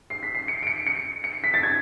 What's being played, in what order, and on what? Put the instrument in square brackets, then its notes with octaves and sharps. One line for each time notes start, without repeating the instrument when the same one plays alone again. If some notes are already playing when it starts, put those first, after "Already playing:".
[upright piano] C7
B6
C7
C#7
D7
C#7
C#7
C#7
B6
A6
G#6